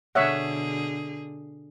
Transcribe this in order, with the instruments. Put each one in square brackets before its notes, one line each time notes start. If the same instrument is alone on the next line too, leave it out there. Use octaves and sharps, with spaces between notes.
[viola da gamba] B2 D3 G#4 [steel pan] C#5 E5 F#5